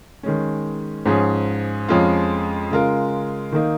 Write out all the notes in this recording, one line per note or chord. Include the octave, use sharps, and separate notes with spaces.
D#3 G#3 C#4
G#2 F3 C#4 G#4
F2 F3 G#3 C#4 F4
C#3 G#3 F4 A#4
D#3 A#3 D#4